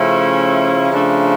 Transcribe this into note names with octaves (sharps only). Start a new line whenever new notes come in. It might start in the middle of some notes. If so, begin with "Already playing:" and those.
Already playing: C#3 F3 A3 C#4 E4
C#3 F3 A3 D4